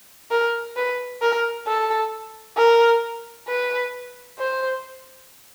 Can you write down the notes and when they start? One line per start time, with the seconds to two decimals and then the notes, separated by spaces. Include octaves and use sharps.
0.31 A#4
0.76 B4
1.22 A#4
1.67 A4
2.57 A#4
3.48 B4
4.39 C5